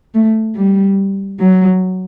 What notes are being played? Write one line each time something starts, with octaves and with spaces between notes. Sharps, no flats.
A3
G3
F#3